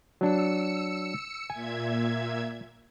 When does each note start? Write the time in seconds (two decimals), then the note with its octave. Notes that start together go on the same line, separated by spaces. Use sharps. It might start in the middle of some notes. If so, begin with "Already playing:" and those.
0.21 F#3 D4 E6 C#7
1.50 A#2 E5 G#5 G#6